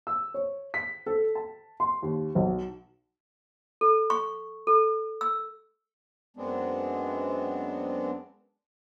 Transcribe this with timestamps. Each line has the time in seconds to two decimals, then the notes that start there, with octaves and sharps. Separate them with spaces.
0.07 E6
0.34 C#5
0.74 B6
1.06 A4
1.35 A5
1.80 C6
2.02 D#2
2.35 B1
3.81 A4
4.10 C#6
4.67 A4
5.21 E6
6.37 F#2 G#3 B3 C4 D4